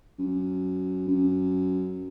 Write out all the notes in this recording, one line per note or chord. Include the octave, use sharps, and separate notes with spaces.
F#2
F#2